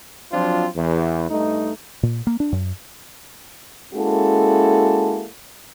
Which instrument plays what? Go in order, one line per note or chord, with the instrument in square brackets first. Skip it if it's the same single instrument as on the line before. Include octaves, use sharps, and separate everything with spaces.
[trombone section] F3 F#3 C4 D4 F4
E2
G2 A3 D#4
[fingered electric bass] A#2
A#3
D4
F#2
[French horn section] G#3 A#3 C#4 E4 F#4 A4